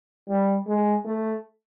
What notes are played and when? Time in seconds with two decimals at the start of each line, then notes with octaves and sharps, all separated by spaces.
0.29 G3
0.67 G#3
1.05 A3